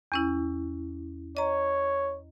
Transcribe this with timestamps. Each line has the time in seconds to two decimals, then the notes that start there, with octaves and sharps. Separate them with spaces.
0.12 E2 C#4 E4
1.37 C#5 D#5 A#5